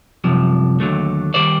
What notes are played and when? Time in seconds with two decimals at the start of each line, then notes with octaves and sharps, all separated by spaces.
0.24 C2 F#2 C3 F3
0.80 D#2 G#2 D3 F#3 A3
1.34 D#3 G3 C5 D5